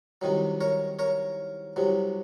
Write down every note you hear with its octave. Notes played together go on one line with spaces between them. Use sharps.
C2 C3 D#3 F#3
A#4 C#5
A#4 C#5
C2 C3 F#3